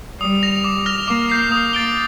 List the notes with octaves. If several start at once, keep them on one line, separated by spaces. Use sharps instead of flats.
G3 D#6
A#6 F7
D6
F6 A#6 F7
A#3 D6
G6 C7
A#3 D#6
A6 D7 G7